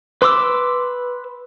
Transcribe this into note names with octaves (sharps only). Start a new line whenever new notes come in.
B4 C6 D6 E6